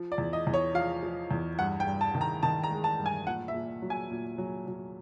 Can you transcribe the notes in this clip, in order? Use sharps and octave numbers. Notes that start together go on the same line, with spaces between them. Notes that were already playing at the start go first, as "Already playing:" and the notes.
Already playing: F3
D5
E2
D#5
E2
C#5
F3 F5
F3
E2
G2 F#5
G5
G2
A5
D#3
A#5
D#3 A5
A#5
G#3
A5
G2
G#5
A#2 F#5
E5
A#2
F#3
G#5
A#2
F#3
F#3